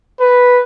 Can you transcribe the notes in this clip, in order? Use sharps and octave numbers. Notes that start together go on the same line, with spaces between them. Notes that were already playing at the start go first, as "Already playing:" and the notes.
B4